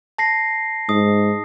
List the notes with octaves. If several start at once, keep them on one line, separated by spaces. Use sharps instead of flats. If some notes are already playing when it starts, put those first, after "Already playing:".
A5 A#6 C7
G#2 D#6